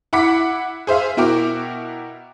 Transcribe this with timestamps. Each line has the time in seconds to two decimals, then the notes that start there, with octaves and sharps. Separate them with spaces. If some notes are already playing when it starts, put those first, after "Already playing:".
0.13 E4 F#5 B5 D6 B6
0.87 G#4 C5 E5 F5
1.17 B2 E4 F#4 A#4 G5 D6